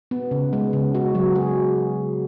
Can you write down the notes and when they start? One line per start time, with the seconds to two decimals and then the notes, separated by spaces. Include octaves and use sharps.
0.11 B3
0.31 C#3
0.53 G#3
0.73 C#3
0.95 F#4
1.15 F#3
1.35 G#4